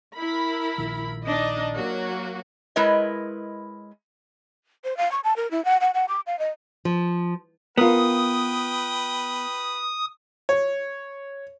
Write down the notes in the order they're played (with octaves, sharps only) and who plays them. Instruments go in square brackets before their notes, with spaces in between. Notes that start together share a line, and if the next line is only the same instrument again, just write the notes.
[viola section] E4 A#4 B5
[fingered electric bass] A#1 A#2 D#3
[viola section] D4 D#4 D#5
F#3 A#3 F#4
[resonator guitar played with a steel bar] G#3 E4 A#4 B4 C#5 D#5
[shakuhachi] C5
F5
C#6
A5
A#4
E4
F#5
F#5
F#5
D6
F5
D#5
[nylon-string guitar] F3
[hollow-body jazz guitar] B3 [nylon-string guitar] F4 A#4 [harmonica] B4 G5 [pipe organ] D#6
[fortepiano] C#5